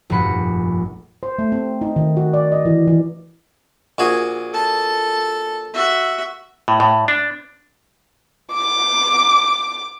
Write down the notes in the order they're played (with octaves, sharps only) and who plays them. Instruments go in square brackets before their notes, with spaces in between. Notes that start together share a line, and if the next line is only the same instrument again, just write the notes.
[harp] F1 A#1 G2 F#4 B5 C#7
[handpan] C5
A3
C4
D#4
D#3
F#4
D5
D#5
E3
E3
[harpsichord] A#1 F#4 G#4
[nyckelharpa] A4 A5
F#4 E5
[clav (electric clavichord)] A2
A2
D4
[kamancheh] D6